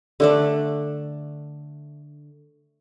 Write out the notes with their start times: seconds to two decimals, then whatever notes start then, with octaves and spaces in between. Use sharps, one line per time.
0.20 D3 A3 D4